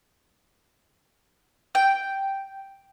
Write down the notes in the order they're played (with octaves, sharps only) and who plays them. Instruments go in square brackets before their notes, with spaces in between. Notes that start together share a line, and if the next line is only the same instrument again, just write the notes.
[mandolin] G5